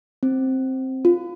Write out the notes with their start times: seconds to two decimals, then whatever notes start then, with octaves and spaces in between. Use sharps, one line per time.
0.23 C4
1.05 F4